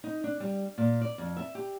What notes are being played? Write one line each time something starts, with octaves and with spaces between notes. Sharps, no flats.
D#4
D4
G3
A#2
D5
F2
E5
G4